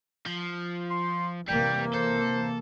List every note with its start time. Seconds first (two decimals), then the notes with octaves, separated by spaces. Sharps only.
0.26 F3
0.91 C6
1.48 C3 E3 G3 A#3 G5
1.94 A4 C5